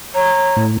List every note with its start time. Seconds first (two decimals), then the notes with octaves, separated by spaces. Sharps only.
0.15 C#5 A#5
0.56 A2